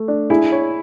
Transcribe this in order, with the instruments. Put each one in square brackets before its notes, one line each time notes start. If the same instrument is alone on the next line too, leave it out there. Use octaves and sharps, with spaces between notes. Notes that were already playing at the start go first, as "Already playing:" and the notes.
Already playing: [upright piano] A3
D4
[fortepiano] E4 [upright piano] G#4
[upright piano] C#5